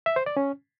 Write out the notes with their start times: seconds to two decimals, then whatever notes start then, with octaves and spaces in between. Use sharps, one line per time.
0.06 E5
0.16 C5
0.26 D5
0.37 C#4